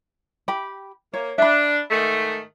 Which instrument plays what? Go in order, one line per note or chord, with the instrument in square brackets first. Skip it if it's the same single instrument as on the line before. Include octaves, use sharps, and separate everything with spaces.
[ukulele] G4 B5
[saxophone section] A#3 [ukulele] C#5
[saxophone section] D4 [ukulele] E5 B5
[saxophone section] G#2 D#3 A3